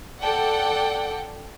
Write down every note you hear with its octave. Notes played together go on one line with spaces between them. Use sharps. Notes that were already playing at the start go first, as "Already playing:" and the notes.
A4 D5 F#5 G5